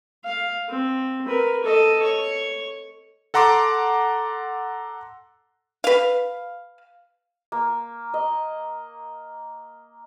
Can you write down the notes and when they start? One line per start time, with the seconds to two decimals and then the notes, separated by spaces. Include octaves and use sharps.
0.24 F5
0.69 C4
1.26 A#4 B4
1.63 A4 D#5
2.03 C#5
3.34 A4 F#5 A#5 C6 D6
5.84 B4 F5
7.52 A#3
8.14 D#5